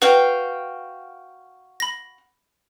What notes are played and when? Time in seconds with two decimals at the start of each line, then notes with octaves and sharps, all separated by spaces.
0.02 F#4 B4 F5 G5
1.80 B5 A#6